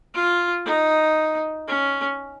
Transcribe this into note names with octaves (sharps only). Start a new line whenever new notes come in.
F4
D#4
C#4